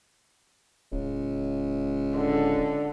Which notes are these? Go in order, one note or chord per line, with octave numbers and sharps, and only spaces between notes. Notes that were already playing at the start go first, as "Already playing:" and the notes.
D1 C#2
D3